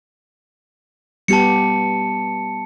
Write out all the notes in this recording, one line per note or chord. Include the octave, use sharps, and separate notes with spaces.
G3 B3 G4 A5 C#7